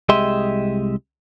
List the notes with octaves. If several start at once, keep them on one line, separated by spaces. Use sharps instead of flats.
C2 G#3 G4 D#5 E5 C6